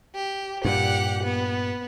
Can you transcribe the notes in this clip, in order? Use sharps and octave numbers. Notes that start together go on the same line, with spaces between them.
G4
G2 A#2 G4 F#5
B3